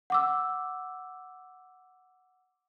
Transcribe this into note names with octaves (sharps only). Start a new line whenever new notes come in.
F#5 D6 E6